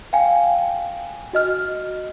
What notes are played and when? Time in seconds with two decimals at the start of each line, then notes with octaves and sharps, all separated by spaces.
0.13 F5 G5 G#5
1.33 F#4 D#5 F6